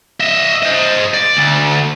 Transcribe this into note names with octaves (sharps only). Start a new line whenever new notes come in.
D#5 E5
C5 D#5
D5
D2